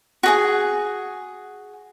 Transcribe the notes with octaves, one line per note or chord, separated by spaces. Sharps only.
F#4 G#4 G#5